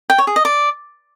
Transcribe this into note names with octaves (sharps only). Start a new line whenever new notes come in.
G5
C#5
G#4
D#5
D5